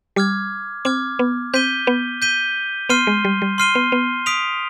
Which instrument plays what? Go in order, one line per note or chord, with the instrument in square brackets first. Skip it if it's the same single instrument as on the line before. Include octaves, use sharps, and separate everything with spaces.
[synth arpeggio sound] G3 [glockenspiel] D6 F6 G#6
[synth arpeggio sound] C4 [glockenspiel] D6 F6 G#6
[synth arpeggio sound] B3
[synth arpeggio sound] C4 [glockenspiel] G6 B6 D#7 G7
[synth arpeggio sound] B3
[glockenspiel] G6 B6 D#7 G7
[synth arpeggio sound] B3 [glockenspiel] C6 F6 C7 D#7 G7
[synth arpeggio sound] G#3
G3
G3
[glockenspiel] C6 F6 C7 D#7 G7
[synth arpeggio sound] B3
B3
[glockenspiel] D#6 B6 D7 F7